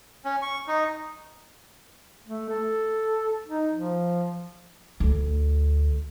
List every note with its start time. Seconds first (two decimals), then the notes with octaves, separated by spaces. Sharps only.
0.25 C#4
0.42 C#6
0.68 D#4
2.26 A3
2.50 A4
3.48 D#4
3.73 F3
5.00 D2